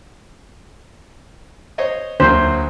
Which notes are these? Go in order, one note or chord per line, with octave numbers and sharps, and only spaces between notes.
C5 C#5 D#5
D2 F#3 A#3 C5